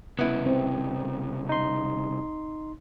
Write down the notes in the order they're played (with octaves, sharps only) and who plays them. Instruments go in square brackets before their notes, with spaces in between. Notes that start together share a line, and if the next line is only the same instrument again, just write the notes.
[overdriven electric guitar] C2 C#3 [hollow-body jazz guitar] B3 E4
[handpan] C4
[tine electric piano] D#4 C6